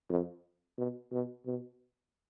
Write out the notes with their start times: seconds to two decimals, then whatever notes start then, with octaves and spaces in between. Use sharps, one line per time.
0.09 F2
0.78 B2
1.12 B2
1.46 B2